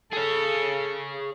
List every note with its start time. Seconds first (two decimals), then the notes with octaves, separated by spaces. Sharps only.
0.13 G#4 A4 C#5